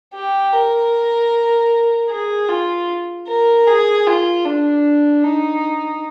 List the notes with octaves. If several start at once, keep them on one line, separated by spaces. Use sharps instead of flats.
G4
A#4
G#4
F4
A#4
G#4
F4
D4
D#4